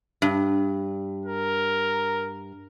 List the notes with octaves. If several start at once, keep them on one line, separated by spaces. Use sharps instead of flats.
G2
A#4